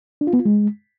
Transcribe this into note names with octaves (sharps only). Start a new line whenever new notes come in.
D4
F4
B3
F4
G#3